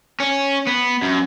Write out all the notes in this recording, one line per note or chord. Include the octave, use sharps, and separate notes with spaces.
C#4
B3
F#2